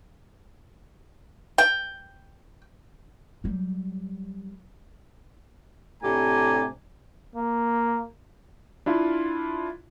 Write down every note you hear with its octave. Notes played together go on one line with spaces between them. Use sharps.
G5
F#3 G3
A2 C3 D4 G4 G#5 A#5
A#3
D4 E4 F4